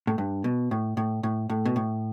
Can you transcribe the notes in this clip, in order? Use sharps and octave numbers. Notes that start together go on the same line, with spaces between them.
A2
G2
B2
A2
A2
A2
A2
B2
A2